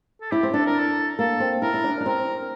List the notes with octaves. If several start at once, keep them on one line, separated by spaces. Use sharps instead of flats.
A4
E4 G4
C4
D4 A4
A#4
A4
A#3 A4
C4
E4 A#4
E4
D4
D4
C4 A#4